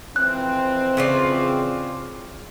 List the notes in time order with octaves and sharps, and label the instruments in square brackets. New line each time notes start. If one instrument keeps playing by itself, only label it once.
[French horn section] F2 E3 C4 [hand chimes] F#6
[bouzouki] C#3 F4 D5